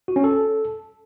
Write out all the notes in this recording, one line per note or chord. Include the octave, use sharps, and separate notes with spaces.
F#4
C#4
A4